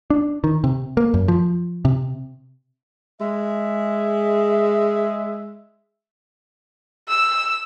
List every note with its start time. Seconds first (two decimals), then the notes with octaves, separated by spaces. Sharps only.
0.10 D4
0.44 D#3
0.64 C3
0.97 A#3
1.14 F#2
1.28 F3
1.85 C3
3.21 G#3 E5
7.08 E6